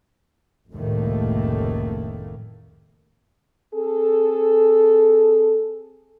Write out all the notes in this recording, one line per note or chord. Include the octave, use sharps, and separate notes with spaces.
F1 C#2 A2 D#3 A3 A#3
C4 G#4 A4